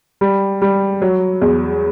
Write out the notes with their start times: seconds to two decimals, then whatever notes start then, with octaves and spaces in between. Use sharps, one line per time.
0.21 G3
0.62 G3
1.02 F#3
1.41 E2